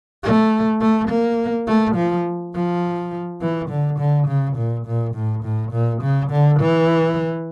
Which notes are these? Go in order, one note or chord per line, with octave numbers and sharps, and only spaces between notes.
A3
A3
A#3
A3
F3
F3
E3
D3
D3
C#3
A#2
A#2
A2
A2
A#2
C#3
D3
E3